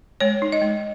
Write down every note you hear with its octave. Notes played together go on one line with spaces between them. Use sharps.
G#3 C#5
D#4
D#5
G#3